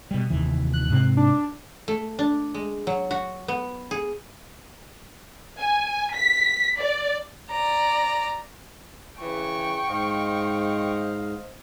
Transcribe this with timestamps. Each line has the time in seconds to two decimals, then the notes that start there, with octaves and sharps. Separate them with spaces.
0.11 B2 G3
0.30 F1 D#2 E3
0.73 F#6
0.90 G#2 C3 C4
1.17 D4
1.88 A3
2.19 D4
2.54 G#3
2.87 F#3
3.11 F#4
3.48 B3
3.91 G#4
5.59 G#5
6.14 B6
6.80 D5
7.51 D5 A#5
9.20 C#3 E3 G5 C#6
9.86 G#2 C5 D#5 F5